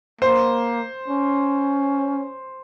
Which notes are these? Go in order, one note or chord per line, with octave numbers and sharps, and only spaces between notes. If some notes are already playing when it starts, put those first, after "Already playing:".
A#3 C5
C#4